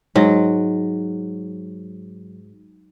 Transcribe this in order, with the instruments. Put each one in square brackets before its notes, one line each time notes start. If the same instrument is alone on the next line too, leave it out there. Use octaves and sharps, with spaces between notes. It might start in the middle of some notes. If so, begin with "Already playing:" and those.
[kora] G#2 F#3